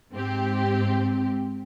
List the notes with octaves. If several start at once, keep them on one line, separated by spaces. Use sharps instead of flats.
G#2 C4 G4